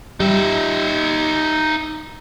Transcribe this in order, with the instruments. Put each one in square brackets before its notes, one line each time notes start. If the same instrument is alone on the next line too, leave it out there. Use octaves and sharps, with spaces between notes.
[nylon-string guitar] G3 [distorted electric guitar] D#4 E5